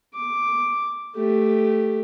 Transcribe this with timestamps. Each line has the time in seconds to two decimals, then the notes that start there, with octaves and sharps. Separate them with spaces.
0.15 D6
1.16 A3 G4